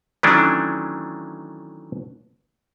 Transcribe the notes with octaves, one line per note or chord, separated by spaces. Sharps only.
D#3 E3 F#3 A3 C#4 D4